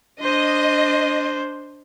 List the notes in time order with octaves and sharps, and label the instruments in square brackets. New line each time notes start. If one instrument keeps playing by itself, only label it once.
[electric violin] D4 C5 [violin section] D#5